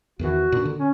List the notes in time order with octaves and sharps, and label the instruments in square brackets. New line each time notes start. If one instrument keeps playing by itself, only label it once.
[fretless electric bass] E2 D#3 E3 [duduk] F#4
[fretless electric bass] A#2 D4
D3
[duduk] C#4